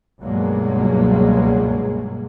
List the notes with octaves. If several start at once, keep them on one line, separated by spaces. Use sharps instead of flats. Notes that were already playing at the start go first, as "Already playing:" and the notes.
C#2 G2 B2 F#3 G#3 A#3